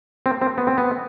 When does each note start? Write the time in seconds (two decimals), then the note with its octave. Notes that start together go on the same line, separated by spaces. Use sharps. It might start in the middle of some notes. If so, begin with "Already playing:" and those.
0.26 C4
0.42 C4
0.58 B3
0.67 C4
0.78 B3